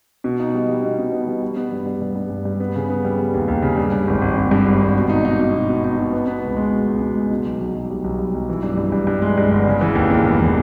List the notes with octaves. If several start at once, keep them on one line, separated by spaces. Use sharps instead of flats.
B2
D#4
G3
G3
B2
B2
B3
G3
G3
B3
G2
G2
G2
G2
G2
G2
B3
C#3
B3
G3
G3
D#2
D#2
C#3
G2
G2
G#1
G#1
G2
G2
G#1
G#1
B2
D#4
D#4
B2
B2
B2
D#4
B2
B3
B3
C#2
G#3
B2
C#2
B2
G#3
B2
B1
B1
B1
G3
B1
G3
B1
E3
G2
G2
G2
G2
G#3
G2
G1
C#3
E3
D#2
D#2
E1
E3